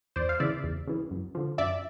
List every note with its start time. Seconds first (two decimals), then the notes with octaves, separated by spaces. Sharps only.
0.16 E2 C5 D5
0.29 F5
0.40 C#3 E3 D5 E5
0.64 E2
0.87 C#3 E3
1.11 F#2
1.35 D3 F3
1.58 F#2 D5 E5